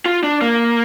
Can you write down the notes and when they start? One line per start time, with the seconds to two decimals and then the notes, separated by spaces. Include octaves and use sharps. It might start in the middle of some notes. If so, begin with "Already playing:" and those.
0.06 F4
0.23 D4
0.42 A#3